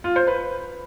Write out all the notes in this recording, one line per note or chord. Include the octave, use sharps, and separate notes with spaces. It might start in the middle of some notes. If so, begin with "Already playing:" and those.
F4
C5
B4